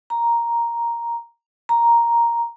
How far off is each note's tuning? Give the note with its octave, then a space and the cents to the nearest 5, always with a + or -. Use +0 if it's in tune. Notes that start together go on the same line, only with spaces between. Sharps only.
A#5 +5
A#5 +5